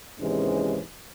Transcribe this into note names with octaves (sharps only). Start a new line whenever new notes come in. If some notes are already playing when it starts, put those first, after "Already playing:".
D#2 G#2 C3 E3 G#3 C#4